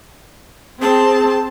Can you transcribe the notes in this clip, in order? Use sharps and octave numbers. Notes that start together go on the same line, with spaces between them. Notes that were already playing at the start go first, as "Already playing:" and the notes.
C4 G#4 A5